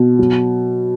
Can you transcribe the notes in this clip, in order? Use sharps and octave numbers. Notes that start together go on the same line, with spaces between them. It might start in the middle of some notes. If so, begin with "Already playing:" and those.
Already playing: B2
F#3